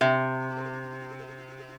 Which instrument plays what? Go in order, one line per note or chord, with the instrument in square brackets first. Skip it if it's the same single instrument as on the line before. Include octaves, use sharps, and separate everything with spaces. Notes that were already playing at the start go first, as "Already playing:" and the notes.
[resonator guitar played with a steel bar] C3 [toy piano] E5